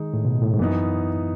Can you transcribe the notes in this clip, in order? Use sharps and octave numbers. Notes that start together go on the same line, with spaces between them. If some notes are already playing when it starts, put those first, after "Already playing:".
Already playing: D#3 G#3 D#4
A2
B2
A2
G#2
F#2 E3 B3 D#4